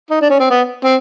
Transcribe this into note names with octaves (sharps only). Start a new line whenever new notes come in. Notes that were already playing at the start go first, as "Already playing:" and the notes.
D#4
D4
C#4
C4
B3
C4